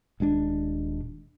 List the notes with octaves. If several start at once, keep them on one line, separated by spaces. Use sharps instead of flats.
D#1 G#3 C#4 D4